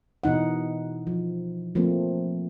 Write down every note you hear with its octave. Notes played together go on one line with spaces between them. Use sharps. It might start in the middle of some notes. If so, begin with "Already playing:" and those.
B2 E3 D#4 F#5
F3
F3 A3 A#3 C4